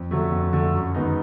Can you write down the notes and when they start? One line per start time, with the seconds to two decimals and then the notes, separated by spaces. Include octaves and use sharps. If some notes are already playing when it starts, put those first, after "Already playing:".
Already playing: F2
0.11 D3 F#3 A3
0.32 F2
0.53 D3 F#3 A3
0.74 F#2
0.94 D#3 G#3 B3 D#4